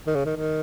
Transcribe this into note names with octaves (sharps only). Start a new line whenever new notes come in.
D#3
C#3
D#3
D#3